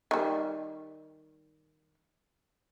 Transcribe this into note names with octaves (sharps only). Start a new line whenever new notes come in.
D#3 G3